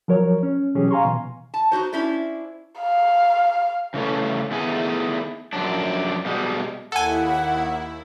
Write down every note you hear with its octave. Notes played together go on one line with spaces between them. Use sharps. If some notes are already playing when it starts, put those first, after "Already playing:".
F3 F#3 A#4 C#5
C#4
B2 E3 F#3 C#4 G4 G#4
F5 G#5 A#5 C6 C#6
B2 E3
A5
D#4 E4 F#4 C5
C#4 D4 E4 C5 D5
F5
C#3 E3 A3 C#4
D#3 A3 B3 E4 G#4 G#5
F#2 F3 F#3 D4
B2 G3 G#3
D#2 E4 A4 F#5 G#5